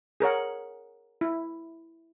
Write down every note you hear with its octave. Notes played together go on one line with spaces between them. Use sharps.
G#4 A#4 C#5 F#5
E4